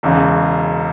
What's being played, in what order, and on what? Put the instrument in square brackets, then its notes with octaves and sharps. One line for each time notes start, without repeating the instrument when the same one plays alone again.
[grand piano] E1 E2 C#3